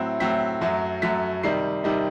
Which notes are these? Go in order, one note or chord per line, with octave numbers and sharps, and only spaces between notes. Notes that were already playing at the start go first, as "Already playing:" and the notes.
Already playing: A2 F#3 C4 E4
A2 F#3 C4 E4 B6
F#2 F#3 A3
F#2 F#3 A3 B6
C3 D#3 G3 D#4 C7
C3 D#3 G3 D#4